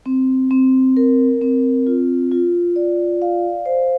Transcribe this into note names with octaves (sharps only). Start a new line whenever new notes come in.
C4
C4
A#4
C4
F4
F4
D5
F5
C5